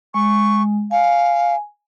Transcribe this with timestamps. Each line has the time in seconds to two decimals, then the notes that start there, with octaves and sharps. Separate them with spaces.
0.14 G#3 C#6
0.91 F5 G#5